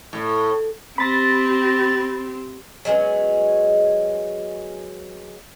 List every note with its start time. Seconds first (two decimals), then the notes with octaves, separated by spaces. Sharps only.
0.13 A2
0.98 C4 G4 B5 A6 A#6
2.85 F#3 G#3 B3 C#4